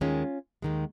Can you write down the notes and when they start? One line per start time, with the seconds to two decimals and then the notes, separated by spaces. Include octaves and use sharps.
0.01 D#2 D#3 G#3 C#4 F4
0.62 D#2 D#3 G#3